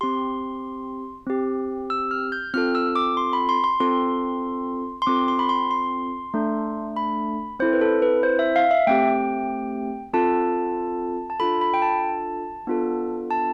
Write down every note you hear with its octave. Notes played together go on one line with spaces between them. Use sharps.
C4 G4 C6
C4 G4
E6
F6
G6
C4 F4 A4 F6
E6
D6
C6
B5
C6
C6
C4 F4 A4 C6
C6
C4 F4 A4 D6
C6
B5
C6
C6
A3 D4 A4
B5
C4 E4 A4 C5
B4
A4
B4
C5
E5
F5
E5
A3 C4 G4 G5
C4 F4 A4 A5
A5
D4 F4 A4 B5
B5
G5
A5
B3 D4 F4 A4
A5